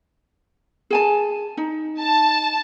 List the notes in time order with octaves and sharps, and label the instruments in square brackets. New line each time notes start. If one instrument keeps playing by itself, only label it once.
[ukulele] G#4 G#5 A5
D#4
[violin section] A5